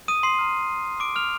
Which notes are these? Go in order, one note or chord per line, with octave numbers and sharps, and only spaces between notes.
D#6 D#7
C6 C7
A#5 F6
D6 D7
F6 F7